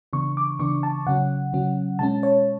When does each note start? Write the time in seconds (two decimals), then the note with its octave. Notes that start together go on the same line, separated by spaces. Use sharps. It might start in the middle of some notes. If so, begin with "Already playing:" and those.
0.13 C#3 E3 B3 D4 C#6
0.37 D6
0.59 C#3 E3 B3 D4 C#6
0.83 A5
1.07 C#3 F#3 C#4 F#5
1.53 C#3 F#3 C#4
1.99 B2 G#3 C#4 A5
2.23 C#5